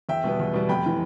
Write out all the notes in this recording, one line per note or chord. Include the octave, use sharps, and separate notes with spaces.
E2 E5 G5
B2 G3 B3
E2
B2 G3 B3
F1 G5 B5
E3